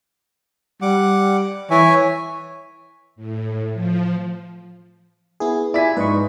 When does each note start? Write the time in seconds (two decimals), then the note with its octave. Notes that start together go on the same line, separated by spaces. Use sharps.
0.82 G3 F#5 D6
1.71 E3 C#5 E5 G#5
3.16 A2
3.73 F3
5.40 B3 E4 G#4
5.74 E4 F4 D5 E5 G#5 B6
5.97 G#2 B4 D#5 C#6